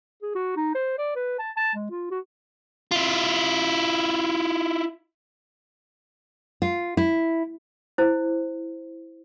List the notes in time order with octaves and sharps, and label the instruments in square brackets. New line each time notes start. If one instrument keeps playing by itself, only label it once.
[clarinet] G#4
F#4
D#4
C5
D5
B4
A5
A5
G#3
F4
F#4
[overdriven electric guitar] E4 F4
[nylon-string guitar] F4
E4
[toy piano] E4 C5